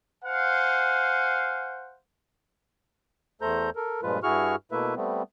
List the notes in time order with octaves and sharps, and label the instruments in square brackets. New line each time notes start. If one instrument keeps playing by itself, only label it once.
[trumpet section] C5 F5 F#5 G#5
[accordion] E2 A3 A4 C5 A#5 G6
A4 A#4
G2 A#2 F3 G#3 F4 B4
G2 E4 F#4 G#4 C#6 F6
B2 A3 A#3 E4 B4 E5
G3 A3 B3 C4